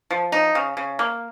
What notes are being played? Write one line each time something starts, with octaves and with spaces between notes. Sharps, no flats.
F3
D#4
C#3
C#3
A#3